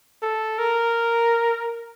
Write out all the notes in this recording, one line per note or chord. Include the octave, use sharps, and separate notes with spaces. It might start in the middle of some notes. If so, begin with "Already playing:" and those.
A4
A#4